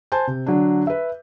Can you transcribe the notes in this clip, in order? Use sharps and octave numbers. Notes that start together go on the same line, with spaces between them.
C5 G#5 A5 C6 G6
C3
D3 F#3 D4
B4 E5